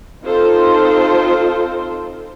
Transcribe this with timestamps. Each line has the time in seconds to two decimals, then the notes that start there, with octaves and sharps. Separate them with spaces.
0.23 C4 D#4 F4 A4 C5